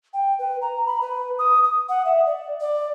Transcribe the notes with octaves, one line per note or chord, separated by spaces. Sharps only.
G5
B4
A#5
B5
B4
D#6
D#6
F#5
E5
D5
D5